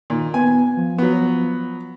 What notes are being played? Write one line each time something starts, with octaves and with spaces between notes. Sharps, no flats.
A#2 D#3
B3 G#5
F3
F#3 B3